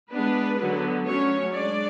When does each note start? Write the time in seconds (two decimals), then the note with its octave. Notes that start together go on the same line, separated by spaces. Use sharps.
0.12 G#3 B3 D4 B4
0.59 D3 F#3 B3
1.06 F#3 A3 C#4 C#5
1.52 G#3 D4 D5